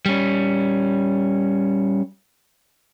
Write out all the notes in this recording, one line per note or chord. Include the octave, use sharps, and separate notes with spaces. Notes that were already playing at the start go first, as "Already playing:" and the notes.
G3 C#4